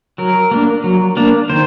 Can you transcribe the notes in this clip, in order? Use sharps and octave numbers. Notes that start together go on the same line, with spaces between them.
F#3 A#4
A#3 D4
F#3
A#3 D4
D#3 C5